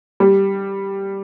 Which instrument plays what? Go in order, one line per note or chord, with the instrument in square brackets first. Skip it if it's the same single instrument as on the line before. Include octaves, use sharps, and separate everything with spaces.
[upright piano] G3